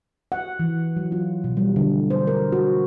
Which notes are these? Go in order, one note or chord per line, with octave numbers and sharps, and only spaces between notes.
F#5
E3
F#3
F4
B2
G3
D3
C5
A#4
F#4